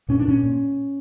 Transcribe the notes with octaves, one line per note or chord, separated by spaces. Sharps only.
A#2 C#4
D4
A#2 C#4
A#2